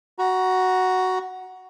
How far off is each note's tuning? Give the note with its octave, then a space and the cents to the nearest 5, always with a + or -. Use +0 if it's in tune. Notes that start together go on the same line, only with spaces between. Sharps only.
F#4 +5 A#5 +30